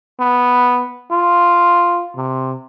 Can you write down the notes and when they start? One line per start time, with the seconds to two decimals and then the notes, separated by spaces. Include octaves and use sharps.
0.20 B3
1.11 F4
2.16 C3